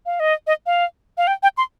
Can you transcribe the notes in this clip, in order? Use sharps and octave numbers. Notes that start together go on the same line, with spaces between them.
F5
D#5
D#5
F5
F5
G5
G5
C6